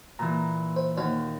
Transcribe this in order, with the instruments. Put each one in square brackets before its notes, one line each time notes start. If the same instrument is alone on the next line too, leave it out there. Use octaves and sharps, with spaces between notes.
[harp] A#2 E3 [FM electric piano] A#5
[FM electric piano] C5
[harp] D#2 [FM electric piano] F#4 C5 C#5